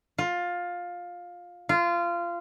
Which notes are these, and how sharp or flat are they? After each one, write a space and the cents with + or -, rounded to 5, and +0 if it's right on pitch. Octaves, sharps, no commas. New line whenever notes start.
F4 +15
F4 -20